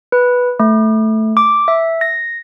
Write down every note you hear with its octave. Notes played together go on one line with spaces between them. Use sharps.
B4
A3
D6
E5
A#6